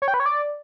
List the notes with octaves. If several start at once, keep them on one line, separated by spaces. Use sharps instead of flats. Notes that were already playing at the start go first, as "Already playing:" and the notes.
C#5
G5
B4
C#5
D5